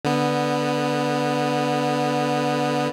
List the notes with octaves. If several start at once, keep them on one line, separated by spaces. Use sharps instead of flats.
D3 B3